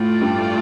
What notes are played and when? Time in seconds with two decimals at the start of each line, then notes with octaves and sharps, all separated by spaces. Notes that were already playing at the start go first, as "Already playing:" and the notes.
Already playing: A2 A3 F4 D5
0.21 G2